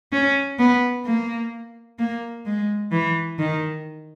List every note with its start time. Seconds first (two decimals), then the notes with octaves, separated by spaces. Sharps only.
0.12 C#4
0.59 B3
1.05 A#3
1.99 A#3
2.46 G#3
2.92 E3
3.39 D#3